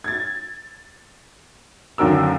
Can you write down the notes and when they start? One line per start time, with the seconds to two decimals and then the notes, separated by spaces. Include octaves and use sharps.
0.04 G#6 A6
1.98 F#1 D#2 D3 F#3 A#4 E6